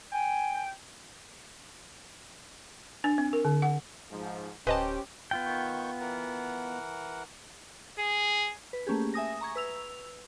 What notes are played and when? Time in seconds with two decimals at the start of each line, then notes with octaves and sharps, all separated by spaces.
0.13 G5 G#5
3.04 D4
3.18 C4
3.33 A#4
3.45 D3
3.62 F#5
4.12 G#2 F3
4.67 D1 C#4 G4 G#4 B4 C5 D#5 A5
5.31 B3 F4 G5
5.46 D#3 C#6 G6
6.00 E3 A#4 F#5
7.99 G#4
8.73 B4
8.87 A3 A#3 C#4 G4 G#4
9.14 E5 G#5 D#6 A#6
9.41 A#5 C#6 G#6
9.56 B4 E6 F7